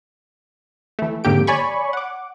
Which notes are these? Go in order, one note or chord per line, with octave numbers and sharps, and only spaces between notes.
E3 A3
F2 G#2 D3 A#3 G4 D7
C#5 D5 G#5 B5 C#6
F#5 D6